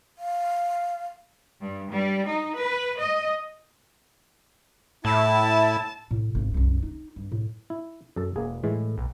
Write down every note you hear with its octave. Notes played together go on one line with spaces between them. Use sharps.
F5
G2
G3
D#4
B4
D#5
A2 E4 A5
A2
G#1 D#4
C2 F#2
D#4
G2
A2
E4
F#2 A4 A5
E1 A#3 G#4
A2 E3 G#3
B1